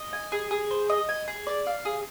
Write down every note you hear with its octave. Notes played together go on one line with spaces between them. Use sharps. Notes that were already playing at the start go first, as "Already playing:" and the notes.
Already playing: D#5
G#5
G#4
G#4
C5
D#5
G#5
G#4
D5
F5
G#4